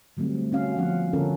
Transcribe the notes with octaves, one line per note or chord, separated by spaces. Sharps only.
D3 F#3 G3 A3 C4
D3 C#4 F#4 F5
F3 B3 C#4 F#5
D3 C#4 F4 A4 A#4